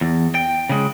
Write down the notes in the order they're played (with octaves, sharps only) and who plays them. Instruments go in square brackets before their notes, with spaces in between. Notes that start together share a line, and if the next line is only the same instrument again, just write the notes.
[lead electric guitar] E2
G5
C#3 G#3